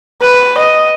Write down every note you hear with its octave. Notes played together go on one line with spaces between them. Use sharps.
B4
D#5